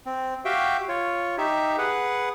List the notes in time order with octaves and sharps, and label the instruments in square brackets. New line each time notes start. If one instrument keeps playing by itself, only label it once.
[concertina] C4
F#4 G4 E5 F5 G5
F4 C#5
D#4 G4 E5
G#4 B4 F#5